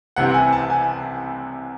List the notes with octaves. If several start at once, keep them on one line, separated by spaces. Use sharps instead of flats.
C2 C3 E3 C4 F#5
F#5
G#5
A5
G#5